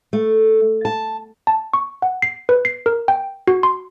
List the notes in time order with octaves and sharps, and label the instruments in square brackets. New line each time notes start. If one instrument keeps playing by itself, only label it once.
[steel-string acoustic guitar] A3
A5
[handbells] A5
C#6
F#5
C7
B4
C7
A#4
G5
F#4
C6